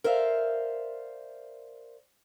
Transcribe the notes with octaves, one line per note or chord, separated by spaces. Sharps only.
A#4 C5 D5 E5 F5